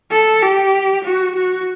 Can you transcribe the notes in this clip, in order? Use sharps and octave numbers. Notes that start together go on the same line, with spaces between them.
A4
G4
F#4
F#4